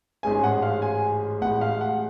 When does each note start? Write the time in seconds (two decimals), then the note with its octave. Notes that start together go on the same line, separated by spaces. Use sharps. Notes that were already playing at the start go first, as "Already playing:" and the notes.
0.23 A1 G#2 G#3 C#4 G#5
0.43 F#5
0.62 F5
0.82 G#5
1.41 A1 A2 G#3 F#5
1.61 F5
1.81 F#5